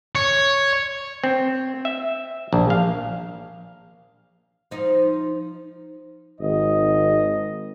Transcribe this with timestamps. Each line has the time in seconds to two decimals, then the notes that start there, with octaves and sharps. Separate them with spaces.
0.15 C#5
1.24 C4
1.85 E5
2.53 A#1
2.70 F5
4.71 F3 D#4
6.41 G#1 D#5